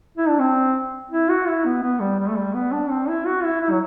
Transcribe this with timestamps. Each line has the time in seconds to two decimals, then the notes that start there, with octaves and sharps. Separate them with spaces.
0.18 E4
0.29 D4
0.39 C4
1.11 E4
1.29 F#4
1.47 E4
1.65 B3
1.83 B3
2.00 G3
2.19 G3
2.29 A3
2.36 G3
2.54 B3
2.72 D4
2.90 C4
3.08 E4
3.26 F#4
3.43 E4
3.61 E4
3.71 F#3